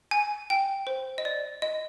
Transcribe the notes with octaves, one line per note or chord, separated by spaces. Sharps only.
G#5
G5
C5
D#5
D5
D#5